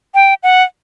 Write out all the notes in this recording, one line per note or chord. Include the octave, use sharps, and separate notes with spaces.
G5
F#5